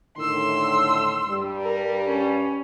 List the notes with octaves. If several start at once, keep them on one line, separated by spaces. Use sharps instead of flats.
A2 D3 D#3 C6 E6
G2 G3
A#4
C#4